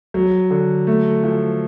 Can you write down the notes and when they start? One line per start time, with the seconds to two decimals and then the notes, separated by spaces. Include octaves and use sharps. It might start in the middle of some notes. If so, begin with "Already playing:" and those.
0.14 F#3
0.50 D3
0.87 A3
1.24 F3